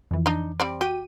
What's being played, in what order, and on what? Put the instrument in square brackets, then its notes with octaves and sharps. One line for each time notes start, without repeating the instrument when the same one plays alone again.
[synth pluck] F2 E3
[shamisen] D4 D#4
G3 C4 D5
[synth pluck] F#4 G5 D#7 [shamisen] G4